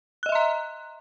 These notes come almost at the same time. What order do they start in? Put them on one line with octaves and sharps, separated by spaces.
F#6 D#5 E5 C6 A#5